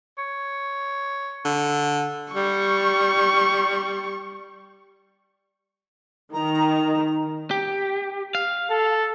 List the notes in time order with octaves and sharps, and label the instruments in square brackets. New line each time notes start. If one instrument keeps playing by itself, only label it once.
[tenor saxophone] C#5
[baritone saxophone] D3
[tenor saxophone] G3 [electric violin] C#6
[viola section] D#3 [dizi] A#5
[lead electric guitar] G4
F5
[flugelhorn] A4